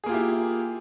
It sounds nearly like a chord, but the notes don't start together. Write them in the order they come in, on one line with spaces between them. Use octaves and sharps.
G#4 A#3 F4 G4 E4